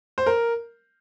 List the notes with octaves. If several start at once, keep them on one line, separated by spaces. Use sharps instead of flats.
C5
A#4